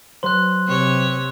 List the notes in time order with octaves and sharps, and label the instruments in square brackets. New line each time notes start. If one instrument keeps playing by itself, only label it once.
[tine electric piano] F#3 B4 C5 [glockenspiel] C6 F#6
[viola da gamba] C3 C#5